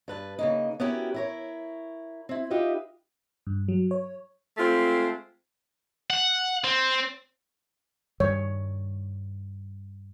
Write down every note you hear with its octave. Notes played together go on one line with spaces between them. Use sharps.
G2 B4 A5
C#3 A#3 D#4
B3 C#4 E4 F#4 G4 A#4
E4 A#4 C#5
C4 E4
D#4 F4 G4 B4 D#5 E5
G2
F#3
C#5
G#3 A3 C4 F4
F#5
C4
G2 D#3 G3 C#5